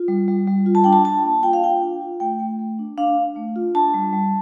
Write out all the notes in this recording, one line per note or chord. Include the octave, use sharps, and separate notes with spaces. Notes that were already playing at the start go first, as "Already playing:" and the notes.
Already playing: F4
G3
G3
G3
F4
A5
D4 G5
A5
D4 A5
A#3
F4 G5
F5
F4 G5
D4
F4
A3 G5
A3
A3
D4
D4 F5
D4
A3
F4
D4 A5
G3
G3